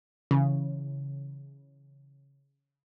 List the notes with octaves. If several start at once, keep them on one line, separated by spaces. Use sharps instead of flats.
C#3 E3